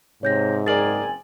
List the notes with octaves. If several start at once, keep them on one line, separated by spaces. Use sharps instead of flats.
G#2 C3 C#5 G6 A#6
F#1 C4 G#4 A#4 D5 G#5 A6 F#7